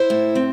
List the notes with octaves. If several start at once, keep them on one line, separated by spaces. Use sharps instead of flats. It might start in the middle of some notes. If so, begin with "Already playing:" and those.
Already playing: E4 C5
A2
C4